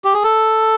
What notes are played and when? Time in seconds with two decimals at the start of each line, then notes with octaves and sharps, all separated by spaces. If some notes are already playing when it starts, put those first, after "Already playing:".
0.05 G4
0.14 G#4
0.24 A4